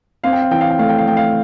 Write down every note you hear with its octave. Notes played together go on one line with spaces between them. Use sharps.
C4 F5
G5
F5
E3 G5
F5
G5
A3 F5
G5
F5
A3 G5
F5